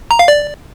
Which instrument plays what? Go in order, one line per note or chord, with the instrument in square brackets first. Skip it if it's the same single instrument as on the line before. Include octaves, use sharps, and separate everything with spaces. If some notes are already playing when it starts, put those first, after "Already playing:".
[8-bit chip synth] A#5
F5
D5